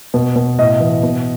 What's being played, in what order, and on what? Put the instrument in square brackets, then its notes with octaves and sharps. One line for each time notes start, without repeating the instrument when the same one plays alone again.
[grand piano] B2
B2
A2 D#5
E3
B2